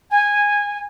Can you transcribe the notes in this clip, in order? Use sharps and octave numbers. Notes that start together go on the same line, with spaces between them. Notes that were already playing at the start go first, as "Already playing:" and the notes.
G#5